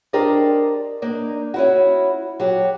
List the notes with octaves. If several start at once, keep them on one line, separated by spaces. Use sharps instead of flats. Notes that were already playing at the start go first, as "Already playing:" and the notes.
D4 G4 A#4 C5 D5 D#5
A#3 D4 D#4
C#4 E4 F#4
F#3 F#4 G4